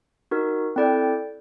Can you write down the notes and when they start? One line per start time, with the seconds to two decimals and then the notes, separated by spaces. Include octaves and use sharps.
0.31 D#4 F#4 A#4
0.76 C4 E4 A4 D5 G5